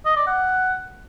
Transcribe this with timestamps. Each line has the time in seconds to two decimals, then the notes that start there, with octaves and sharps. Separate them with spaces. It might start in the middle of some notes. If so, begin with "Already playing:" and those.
0.05 D#5
0.16 D5
0.27 F#5